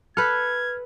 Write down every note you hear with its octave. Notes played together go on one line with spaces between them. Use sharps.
A4 B4 F6 G#6